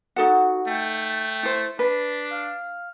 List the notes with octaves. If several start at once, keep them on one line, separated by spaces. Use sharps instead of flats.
D#4 F#4 A4 F#5
A3 G5
E4 C5
D4 B4 B6
F5